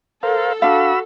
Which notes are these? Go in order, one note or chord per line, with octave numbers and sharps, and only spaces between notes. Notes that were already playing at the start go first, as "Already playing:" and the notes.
A4 A#4 C5 F5
D4 F#4 F5 B5 E6